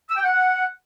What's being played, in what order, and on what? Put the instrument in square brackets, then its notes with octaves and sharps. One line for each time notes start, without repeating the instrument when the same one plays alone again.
[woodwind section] E6
G5
F#5